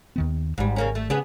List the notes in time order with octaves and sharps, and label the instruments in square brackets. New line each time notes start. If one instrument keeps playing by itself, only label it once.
[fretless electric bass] D#2 D#3 B3
[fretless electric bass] G#1 [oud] G#2 G3
[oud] C#3 A#3 C#4
A3
[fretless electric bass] C#3 [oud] B3 D4 G#4